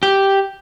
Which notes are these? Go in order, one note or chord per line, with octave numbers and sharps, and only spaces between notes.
G4